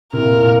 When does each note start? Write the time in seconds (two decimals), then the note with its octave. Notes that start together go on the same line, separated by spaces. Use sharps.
0.13 A2 C3 A#4
0.22 A#2
0.32 A2
0.43 A#2